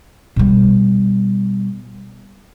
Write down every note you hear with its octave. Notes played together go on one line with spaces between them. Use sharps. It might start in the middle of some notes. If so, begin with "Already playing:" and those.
B2 G3